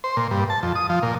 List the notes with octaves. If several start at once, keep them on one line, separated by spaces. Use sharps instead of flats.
C5
A#2
G2
A5
F2
D#6
F3
A#2